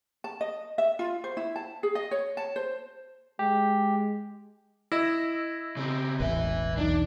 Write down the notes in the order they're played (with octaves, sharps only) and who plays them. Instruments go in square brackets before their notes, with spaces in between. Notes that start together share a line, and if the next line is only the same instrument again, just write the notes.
[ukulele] A5
D#5
E5
F4
C5
E4
A5
G#4
D#5
C#5
A5
C5
[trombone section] G#3 [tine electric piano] G4
[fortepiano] E4 [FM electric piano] D#5 E6 A#6
[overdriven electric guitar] C#3 C4
[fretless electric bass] E1 A1 [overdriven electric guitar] B4 E5
[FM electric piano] B1 E2 D#4 [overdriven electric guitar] D4